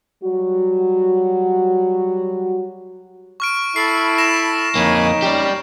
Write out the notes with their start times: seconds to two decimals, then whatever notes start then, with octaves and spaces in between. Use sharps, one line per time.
0.23 F#3 G3 F#4
3.40 C#6 F6 D7
3.76 E4 A4 A5 B5 C7
4.18 A#6 E7
4.76 F2 A#3 D#4 C#5 G#5 B5
5.22 C#4 G4 D5